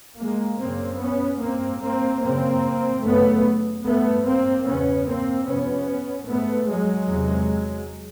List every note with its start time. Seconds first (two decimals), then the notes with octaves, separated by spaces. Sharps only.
0.20 G#3 A#3
0.61 F#2 C#3 A#3 C4
1.01 B3 C#4
1.42 G2 A#3 C4
1.82 A#3 C4
2.23 F#2 C#3 A#3 C4
3.04 F#2 C#3 A3 B3
3.84 G2 A3 B3
4.25 A#3 C4
4.66 E2 C#3 B3 C#4
5.06 A#3 C4
5.46 F2 C3 B3 C#4
6.27 G#2 A3 B3
6.68 F#3 G#3
7.08 E2 C3